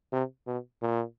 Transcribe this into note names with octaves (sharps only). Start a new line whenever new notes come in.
C3
B2
A#2